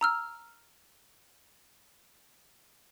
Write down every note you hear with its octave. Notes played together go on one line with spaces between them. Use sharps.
A#5 E6 F6